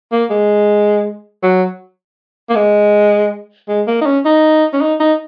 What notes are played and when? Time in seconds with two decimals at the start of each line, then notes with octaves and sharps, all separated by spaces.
0.12 A#3
0.30 G#3
1.43 F#3
2.50 A#3
2.55 G#3
3.69 G#3
3.87 A#3
4.01 D#4
4.06 C#4
4.25 D#4
4.73 C#4
4.81 D#4
5.00 D#4